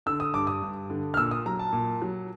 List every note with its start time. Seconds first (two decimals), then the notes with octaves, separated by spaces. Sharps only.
0.06 D3 E6
0.20 D#6
0.34 G2 D6
0.47 D#6
0.62 G2
0.90 D3
1.14 F6
1.17 A#2 E6
1.31 D#6
1.46 F#3 A#5
1.59 A5
1.73 A#2
2.02 F#3